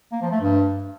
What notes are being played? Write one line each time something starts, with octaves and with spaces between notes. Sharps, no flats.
A#3
F3
A3
G2